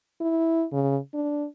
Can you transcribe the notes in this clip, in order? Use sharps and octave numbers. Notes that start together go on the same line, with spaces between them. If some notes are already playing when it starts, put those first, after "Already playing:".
E4
C#3
D4